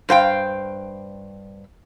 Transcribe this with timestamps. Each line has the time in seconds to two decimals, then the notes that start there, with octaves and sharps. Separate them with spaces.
0.09 G2 C5 F5 G5